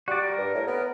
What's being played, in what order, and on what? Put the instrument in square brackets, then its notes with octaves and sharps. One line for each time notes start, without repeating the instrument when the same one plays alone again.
[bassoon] G3 [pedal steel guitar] F#4 D5
[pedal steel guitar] A#4
[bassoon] G2
A2
B3